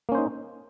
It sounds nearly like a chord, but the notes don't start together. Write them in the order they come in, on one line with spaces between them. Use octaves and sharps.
A#3 C#4 C5 D#4